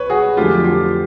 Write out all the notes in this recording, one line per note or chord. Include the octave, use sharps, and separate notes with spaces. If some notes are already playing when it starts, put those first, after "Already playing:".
Already playing: C2 B2 B4 C#5
F#4 G#4
F2 D3 F#3 A3 F4 G4
F4 G4